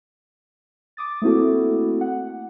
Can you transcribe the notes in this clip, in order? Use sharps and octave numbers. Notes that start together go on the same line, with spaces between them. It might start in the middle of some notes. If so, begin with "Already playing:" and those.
D6 D#6 A6
A3 A#3 C4 E4 F#4 A4
F#5